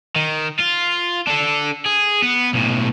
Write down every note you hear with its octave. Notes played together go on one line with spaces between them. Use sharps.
D#3
F4
D4 A4
G#4
B3
B1 A2